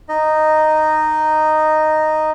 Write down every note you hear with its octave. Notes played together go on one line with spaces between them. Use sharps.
D#4 D#5